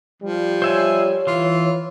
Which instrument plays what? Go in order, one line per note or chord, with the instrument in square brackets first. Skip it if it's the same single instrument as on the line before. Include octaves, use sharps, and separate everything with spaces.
[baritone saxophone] F3 [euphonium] G3
[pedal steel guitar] C5 E5 G#5 [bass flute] C#5
[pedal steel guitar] E3 [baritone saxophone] F4